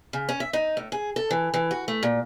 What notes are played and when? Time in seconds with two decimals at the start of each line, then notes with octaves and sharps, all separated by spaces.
0.13 C#3
0.29 C#4
0.40 E5
0.53 D#4
0.77 A2
0.92 G#4
1.16 A4
1.31 E3
1.54 E3
1.71 F#4
1.88 A3
2.03 A#2